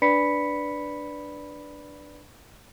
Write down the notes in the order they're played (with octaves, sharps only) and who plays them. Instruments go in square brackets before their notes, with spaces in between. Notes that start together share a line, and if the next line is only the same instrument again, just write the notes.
[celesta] D4 B4 D5 B5 B6 C#7